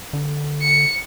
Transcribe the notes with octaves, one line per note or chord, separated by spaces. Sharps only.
D3
C#7